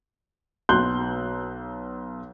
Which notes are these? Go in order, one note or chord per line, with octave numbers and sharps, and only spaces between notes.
B1 C6 F#6 G6 G7